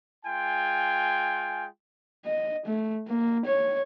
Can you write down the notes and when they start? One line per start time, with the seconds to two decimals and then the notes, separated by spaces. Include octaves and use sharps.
0.25 G#3 F4 G5 G#5
2.25 D#5
2.66 A3
3.08 A#3
3.46 C#5